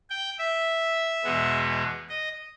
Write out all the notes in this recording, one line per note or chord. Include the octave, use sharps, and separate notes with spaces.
G5
E5
E2 B2 G#3 B3
D#5